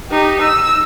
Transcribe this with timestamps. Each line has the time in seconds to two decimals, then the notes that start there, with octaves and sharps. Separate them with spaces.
0.10 D#4 G4
0.42 E6